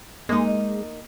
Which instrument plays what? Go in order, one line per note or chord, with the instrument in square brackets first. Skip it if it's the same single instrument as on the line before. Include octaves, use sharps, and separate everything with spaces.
[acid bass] G#3 [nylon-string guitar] A#3 D#4